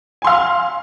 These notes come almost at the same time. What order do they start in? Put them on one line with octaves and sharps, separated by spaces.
G#5 C6 F5